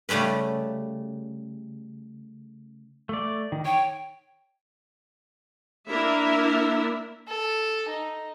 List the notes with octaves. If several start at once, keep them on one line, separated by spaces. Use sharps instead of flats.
C#3 G3 A3 C#4 B4
A3 D5
D#3
C#5 G5
A#3 D4 E4 A#4 E5
A4
D#4